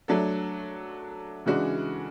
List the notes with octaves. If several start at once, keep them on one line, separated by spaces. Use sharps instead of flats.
F#3 A3 D4 A4
C#3 E3 G#3 D4 F#4